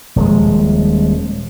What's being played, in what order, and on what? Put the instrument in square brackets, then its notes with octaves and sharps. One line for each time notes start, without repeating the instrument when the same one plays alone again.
[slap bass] D#1 F3 G#3